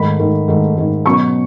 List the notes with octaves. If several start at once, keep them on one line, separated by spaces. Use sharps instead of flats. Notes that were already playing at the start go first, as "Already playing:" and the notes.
Already playing: G#2 D#3 A3 B5
G#2 D#3 A3
G#2 D#3 A3
G#2 D#3 A3
B2 F#3 C#4 C#6